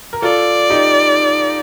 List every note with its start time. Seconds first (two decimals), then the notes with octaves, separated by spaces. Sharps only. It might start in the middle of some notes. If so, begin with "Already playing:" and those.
0.13 A#4
0.22 F4 A4 D5
0.70 D#4 G4